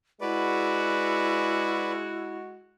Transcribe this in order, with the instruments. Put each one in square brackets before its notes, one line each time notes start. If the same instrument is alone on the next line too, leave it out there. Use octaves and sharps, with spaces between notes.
[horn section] G#3 F#4 [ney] E4 [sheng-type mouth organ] B4 D5